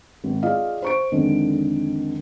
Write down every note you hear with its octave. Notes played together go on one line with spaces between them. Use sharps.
G#1
F4 G#4 D5 D#5 F5
C5 C#6 D7
F2 D3 D#3 G#3